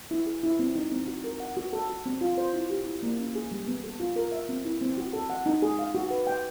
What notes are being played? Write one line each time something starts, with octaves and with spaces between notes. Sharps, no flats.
E4
G#4
E4
C4
D#4
C4
F#4
A#4
F#5
F#4
A4
F#4
C4
F4
C5
E4
G4
E4
A#3
C#4
G#4
G3
B3
A4
F4
A#4
E5
C4
E4
C4
F#4
A4
F#5
D#4
G#4
F5
F#4
B4
G5